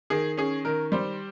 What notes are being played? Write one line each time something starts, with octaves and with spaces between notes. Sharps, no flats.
D#3 G#4
C#4 G#4
D#3 A#4
G3 C5